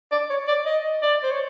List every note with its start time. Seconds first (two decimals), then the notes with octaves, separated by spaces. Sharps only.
0.11 D5
0.30 C#5
0.48 D5
0.66 D#5
1.02 D5
1.23 C5
1.31 C#5